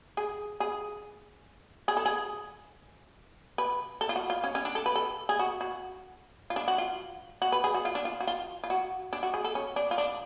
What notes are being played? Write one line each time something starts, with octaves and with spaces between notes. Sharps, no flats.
G#4
G#4
G#4
A4
G#4
B4
A4
F4
F#4
F4
C#4
C#4
D4
A4
B4
A4
G#4
F#4
F#4
F4
D4
F#4
F4
F#4
B4
G#4
F#4
F4
D4
F4
F#4
F4
F4
F#4
D4
F#4
G#4
A4
C#4
D4
F4
D4